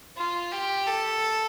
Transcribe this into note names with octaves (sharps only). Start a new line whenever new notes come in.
F4
G4
A4